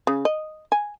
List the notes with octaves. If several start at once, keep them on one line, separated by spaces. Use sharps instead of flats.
C#3
D#5
G#5